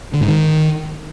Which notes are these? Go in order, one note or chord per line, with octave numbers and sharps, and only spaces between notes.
D3
G#2
D#3